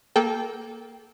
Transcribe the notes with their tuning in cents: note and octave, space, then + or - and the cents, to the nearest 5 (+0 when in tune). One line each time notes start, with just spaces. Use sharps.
A#3 +0 A4 -25 G5 +0